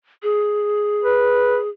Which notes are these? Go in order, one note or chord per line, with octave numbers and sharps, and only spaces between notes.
G#4
B4